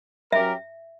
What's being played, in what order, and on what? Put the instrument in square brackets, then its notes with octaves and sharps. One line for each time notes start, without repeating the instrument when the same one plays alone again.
[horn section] F#3 C#4 G4 A#4 [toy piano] E5